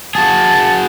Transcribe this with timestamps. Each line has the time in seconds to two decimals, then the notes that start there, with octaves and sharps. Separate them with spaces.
0.15 F#4 G#4 A5